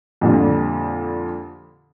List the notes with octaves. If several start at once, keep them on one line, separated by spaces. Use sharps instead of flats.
F2 A#2 D3 G3